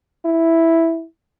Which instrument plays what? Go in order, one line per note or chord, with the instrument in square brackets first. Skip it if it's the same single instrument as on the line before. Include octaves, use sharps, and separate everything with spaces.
[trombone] E4